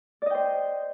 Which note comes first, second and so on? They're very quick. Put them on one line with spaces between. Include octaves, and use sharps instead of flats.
D5 D#5 G5 C5